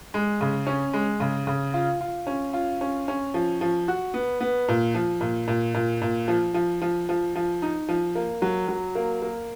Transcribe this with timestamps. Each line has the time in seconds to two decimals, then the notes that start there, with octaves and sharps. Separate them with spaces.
0.14 G#3
0.41 C#3
0.67 C#4
0.93 G#3
1.20 C#3
1.47 C#3
1.74 F4
2.01 F4
2.27 C#4
2.53 F4
2.81 C#4
3.08 C#4
3.34 F3
3.61 F3
3.88 F#4
4.14 B3
4.41 B3
4.68 A#2
4.95 F3
5.21 A#2
5.48 A#2
5.74 A#2
6.02 A#2
6.28 F3
6.54 F3
6.81 F3
7.09 F3
7.35 F3
7.62 D#4
7.89 F3
8.15 A#3
8.42 F#3
8.68 F#3
8.95 A#3
9.22 A#3